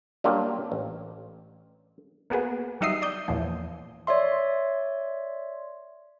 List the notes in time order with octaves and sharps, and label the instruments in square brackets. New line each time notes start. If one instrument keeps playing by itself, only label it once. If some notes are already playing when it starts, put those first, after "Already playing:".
[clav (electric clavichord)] F#3 G3 A#3 D4 F4 G4
A1
[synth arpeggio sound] A#3 B3 F#4 G#4 B4
F#3 G3 D#4 E5 D#6 C7
D5 D#6 G6
E2 A#2 E3 F3
[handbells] C#5 D5 E5 C6